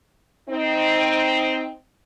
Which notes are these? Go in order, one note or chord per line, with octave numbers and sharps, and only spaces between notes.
C4 D#4